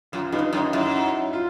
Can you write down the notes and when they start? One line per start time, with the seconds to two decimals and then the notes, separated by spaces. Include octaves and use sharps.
0.12 F#2 F4
0.32 G2 D#4
0.52 F#2 D#4
0.73 F#2 E4
1.33 F4